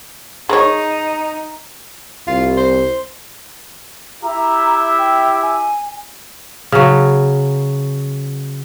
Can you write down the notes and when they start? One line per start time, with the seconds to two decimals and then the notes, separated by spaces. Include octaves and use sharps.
0.49 D#4 G#4 A#4 C#5
2.27 C2 F4
2.57 C5
4.22 E4 G4 E5 A#5
4.98 G5
5.42 G#5
6.72 C#3 F#3